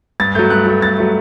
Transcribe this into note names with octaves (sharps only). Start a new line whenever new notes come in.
G2 A6
F#3 A3 G6
G2 F#6
F#3 A3
G2 A6
F#3 A3